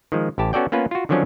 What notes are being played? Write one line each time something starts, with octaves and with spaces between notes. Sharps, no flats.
D#3 F3 G#3
A1 E4 G4 A5
B3 C#4 F#4 A4 D5 G5
A#3 B3 C#4 F4 B4
F4 F#4
D3 D#3 F3 F#3 C#4 D4